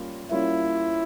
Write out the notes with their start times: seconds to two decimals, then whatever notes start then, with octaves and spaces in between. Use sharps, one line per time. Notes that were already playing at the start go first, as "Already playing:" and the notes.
Already playing: G3 A#3 C#4 F4
0.31 G3 A#3 C#4 E4 F4